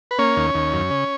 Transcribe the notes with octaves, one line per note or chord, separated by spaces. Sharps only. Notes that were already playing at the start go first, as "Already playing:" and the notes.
B4
A#3 C#4 C#5
D#2
D#2
F#2
C#3